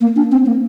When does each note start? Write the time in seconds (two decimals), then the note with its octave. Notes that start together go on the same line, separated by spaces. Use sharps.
0.01 A#3
0.16 D4
0.31 C4
0.46 A#3